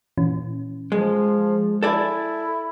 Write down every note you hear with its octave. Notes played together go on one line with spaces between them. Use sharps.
A#2 E3 C#4
F3 G#3
E4 A4 D5 G#5